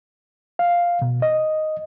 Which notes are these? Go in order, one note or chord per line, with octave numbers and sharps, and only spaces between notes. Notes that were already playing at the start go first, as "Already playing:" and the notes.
F5
B2
D#5